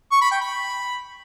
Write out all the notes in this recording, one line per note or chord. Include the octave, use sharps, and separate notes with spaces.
C#6
B5
G5
B5